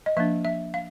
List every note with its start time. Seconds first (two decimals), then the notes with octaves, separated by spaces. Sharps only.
0.06 D#5
0.17 F3 A#3 D4 E5
0.45 E5
0.74 F5